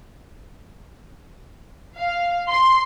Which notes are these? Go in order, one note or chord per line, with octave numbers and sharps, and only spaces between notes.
F5
C6